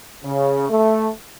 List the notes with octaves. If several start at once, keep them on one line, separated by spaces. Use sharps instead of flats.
C#3
A3